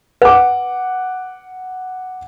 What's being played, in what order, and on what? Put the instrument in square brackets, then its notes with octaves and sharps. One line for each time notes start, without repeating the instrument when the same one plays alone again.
[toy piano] B4 [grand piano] F#5 D6